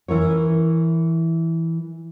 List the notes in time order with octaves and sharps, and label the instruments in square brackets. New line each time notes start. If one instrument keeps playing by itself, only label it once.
[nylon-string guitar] E3 E4 A#4 C#5